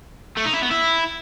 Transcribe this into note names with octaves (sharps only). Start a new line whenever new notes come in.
A3
D#4
E4
B3
E4